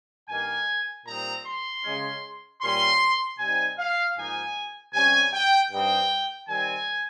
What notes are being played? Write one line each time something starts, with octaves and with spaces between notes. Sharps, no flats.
G2 D#3 A#3 G#5
A#2 G3 C4 D#4 A#5
C6
C#3 G#3 C#4
A#2 G3 C#4 C6
C3 G3 C4 D#4 G#5
F5
G#2 F3 A#3 D#4 G#5
C3 G3 C#4 G#5
G5
G2 G3 C4 D#4 G5
D#3 G3 C4 G#5